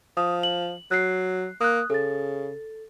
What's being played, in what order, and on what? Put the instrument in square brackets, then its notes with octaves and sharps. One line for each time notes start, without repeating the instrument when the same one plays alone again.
[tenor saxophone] F3 [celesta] D#6
[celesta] F#7
[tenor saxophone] F#3 [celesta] F#6 C7
[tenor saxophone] A#3 [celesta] D#6 F#6
[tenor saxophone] C#3 [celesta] A4 A6